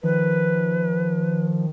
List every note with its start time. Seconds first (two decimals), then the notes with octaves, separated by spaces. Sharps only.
0.03 D#3 F3 B4